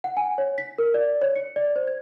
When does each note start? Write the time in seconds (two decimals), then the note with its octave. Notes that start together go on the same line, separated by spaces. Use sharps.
0.04 F#5
0.17 G#5
0.38 C#5
0.58 B6
0.78 A#4
0.94 D5
1.22 C#5
1.36 C#7
1.56 D5
1.76 C5
1.87 G#6